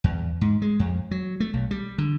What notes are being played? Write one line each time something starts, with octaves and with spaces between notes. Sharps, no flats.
E2
G#2
G#3
F2
F#3
A3
B1
G3
D3